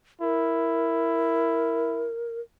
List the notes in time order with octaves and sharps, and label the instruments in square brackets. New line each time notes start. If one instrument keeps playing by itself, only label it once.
[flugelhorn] E4 [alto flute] A#4